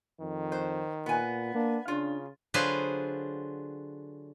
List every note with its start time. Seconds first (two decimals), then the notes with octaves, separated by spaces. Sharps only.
0.21 F2 D#3
0.52 C5
1.06 A#2 B3 G#5
1.54 A#3 D4
1.88 C#3 D4 F4
2.54 D3 F#3 F4 G#4 B4 C5